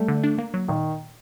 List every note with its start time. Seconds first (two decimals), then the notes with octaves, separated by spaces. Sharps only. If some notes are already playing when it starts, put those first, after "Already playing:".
Already playing: G3 A3
0.08 D3
0.24 D4
0.38 A#3
0.54 F#3
0.68 A#2 D#3